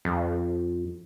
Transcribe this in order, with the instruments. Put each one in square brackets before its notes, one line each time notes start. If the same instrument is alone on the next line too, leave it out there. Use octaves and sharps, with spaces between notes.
[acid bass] F2